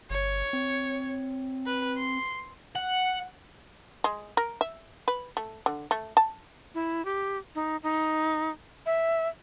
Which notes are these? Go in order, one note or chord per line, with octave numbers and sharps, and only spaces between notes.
G1 C#5
C4
B4
C6
F#5
G#3
A#4
E5
B4
A3
D3
A3
A5
E4
G4
D#4
D#4
E5